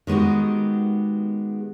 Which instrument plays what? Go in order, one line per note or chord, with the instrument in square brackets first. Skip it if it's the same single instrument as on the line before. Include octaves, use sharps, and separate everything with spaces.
[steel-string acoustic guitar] D#3 G#3 B3 F#4 G4